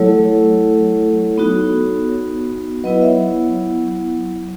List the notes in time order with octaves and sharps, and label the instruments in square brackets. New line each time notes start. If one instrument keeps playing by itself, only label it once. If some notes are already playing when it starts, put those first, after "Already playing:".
Already playing: [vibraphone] F#3 A3 E4 A4 C#5
B3 D#4 F#4
F#3 B3 E4 B4 D#5
C#5 E5